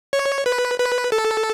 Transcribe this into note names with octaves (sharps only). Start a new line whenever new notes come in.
C#5
B4
B4
A4